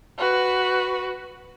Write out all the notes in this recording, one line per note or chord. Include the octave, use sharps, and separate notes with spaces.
F#4 B4